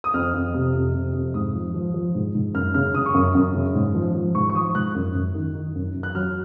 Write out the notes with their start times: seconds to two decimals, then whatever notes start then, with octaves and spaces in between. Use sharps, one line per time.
0.04 D#6
0.14 F2 F6
0.34 F2
0.54 C3
0.74 F2
0.94 C3
1.14 F2
1.34 G#2 D#6
1.54 F3
1.74 F3
1.94 F3
2.15 G#2
2.34 G#2
2.54 F#2 F6
2.74 C#3 F6
2.94 C#3 D#6
3.06 C#6
3.14 F#2 D#6
3.35 F#2
3.55 C#3
3.75 G#2
3.95 F3
4.15 F3
4.35 G#2 C#6
4.49 C#6
4.54 F3 D#6
4.75 G#2 F#6
4.95 F#2
5.15 F#2
5.35 D#3
5.55 D#3
5.75 F#2
5.95 F#2
6.03 F#6
6.15 F#3 F6